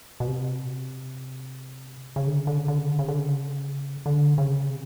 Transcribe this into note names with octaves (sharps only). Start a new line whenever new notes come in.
B2
C3
C#3
D3
C#3
D3
C#3
D3
C#3
D3
C#3
D3
C#3
D3
C#3
C3